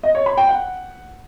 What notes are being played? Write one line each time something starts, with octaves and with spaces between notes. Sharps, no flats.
D#5
C#5
B5
G5
F#5